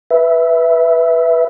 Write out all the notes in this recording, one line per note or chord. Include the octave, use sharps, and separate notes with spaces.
B4 E5